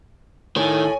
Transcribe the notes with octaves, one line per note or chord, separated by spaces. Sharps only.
A2 D#3 C#5 G#5